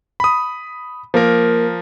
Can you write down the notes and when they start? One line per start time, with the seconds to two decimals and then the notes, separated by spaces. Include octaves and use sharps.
0.20 B5 D#6
1.14 F3 A#3 A#4